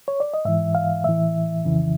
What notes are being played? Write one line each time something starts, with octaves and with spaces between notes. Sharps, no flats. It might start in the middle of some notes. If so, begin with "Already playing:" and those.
C#5
D5
D#5
G#2 E3 E5
F5
A2 E3 E5
F2 C#3 E3